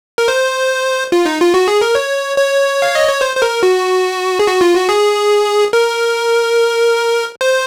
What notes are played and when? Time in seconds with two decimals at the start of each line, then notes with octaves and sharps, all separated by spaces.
0.18 A#4
0.28 C5
1.12 F4
1.26 D#4
1.40 F4
1.54 F#4
1.68 G#4
1.81 A#4
1.95 C#5
2.37 C#5
2.82 F5
2.95 D#5
3.09 C#5
3.21 C5
3.36 C5
3.42 A#4
3.63 F#4
4.39 G#4
4.47 F#4
4.61 F4
4.75 F#4
4.89 G#4
5.73 A#4
7.41 C5